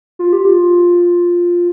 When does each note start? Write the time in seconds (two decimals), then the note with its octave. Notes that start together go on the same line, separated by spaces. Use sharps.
0.19 F4
0.33 G4
0.45 F4